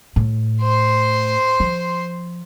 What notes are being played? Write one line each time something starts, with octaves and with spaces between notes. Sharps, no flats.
A2
C5 C6
F3